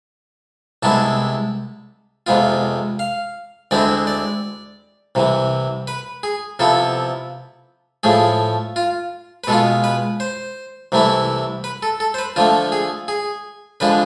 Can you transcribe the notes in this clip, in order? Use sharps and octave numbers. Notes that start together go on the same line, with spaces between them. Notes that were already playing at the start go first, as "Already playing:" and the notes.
C2 C3 G#3 B3 E4 A5
F2 C3 G#3 B3 F4
F5
D2 D3 G#3 C4 E4 D5
D5
C2 C3 E3
B4
G#4
C3 F3 B3 E4 A4
A2 F3 A3 G#4
F4
B4
B2 G#3 B3 F4 A4
B4
C5
C2 C3 E3 A3 E4
B4
A4
A4
C5
B4
D3 F3 A3 F4
G#4
G#4
D3 F3 G#3 D4 B4